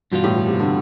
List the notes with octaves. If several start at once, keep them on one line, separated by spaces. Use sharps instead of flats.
G2 B2 E3 G3 B3 F4
A2
B2
C3
D3